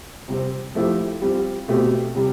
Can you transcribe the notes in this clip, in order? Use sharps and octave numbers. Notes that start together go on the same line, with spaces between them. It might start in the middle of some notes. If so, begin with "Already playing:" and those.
C3 G3 C4
F3 A3 E4 G4
G3 C4 F4
B2 A3 C4 G4
C3 G3